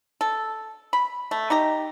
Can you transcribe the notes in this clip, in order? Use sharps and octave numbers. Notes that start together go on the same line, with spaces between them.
A4
B5
A3
D#4 G4 A#5